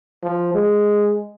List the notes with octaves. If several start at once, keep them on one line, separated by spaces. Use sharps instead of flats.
F3
G#3